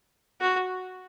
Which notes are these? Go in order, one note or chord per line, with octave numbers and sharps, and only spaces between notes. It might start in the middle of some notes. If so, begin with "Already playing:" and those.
F#4